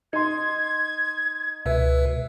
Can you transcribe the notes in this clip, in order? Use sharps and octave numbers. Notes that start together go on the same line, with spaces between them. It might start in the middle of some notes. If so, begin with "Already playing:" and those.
D#4 C6 G#6
C#2 B2 B4 E5